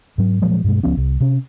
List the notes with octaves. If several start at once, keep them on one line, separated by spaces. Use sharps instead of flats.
G#2 F#3
A#2 F3 F#3 G#3
G2 B2 G#3
C#2 F3 B3 C#4
C2
C3 C#4